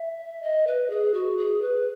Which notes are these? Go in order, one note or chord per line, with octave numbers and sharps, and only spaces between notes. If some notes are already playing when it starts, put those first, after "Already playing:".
Already playing: E5
D#5
B4
G#4
F#4
G#4
B4